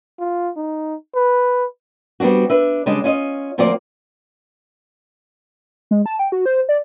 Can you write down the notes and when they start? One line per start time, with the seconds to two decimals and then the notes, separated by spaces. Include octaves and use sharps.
0.20 F4
0.57 D#4
1.15 B4
2.20 G3 B3 C4 D4 F#4
2.50 D4 B4 E5
2.86 C#3 G3 G#3 D4 D#5
3.04 C#4 F4 D#5
3.58 D2 F3 A#3 C4 F4 D5
5.91 G#3
6.06 A5
6.19 G5
6.32 F#4
6.46 C5
6.69 D5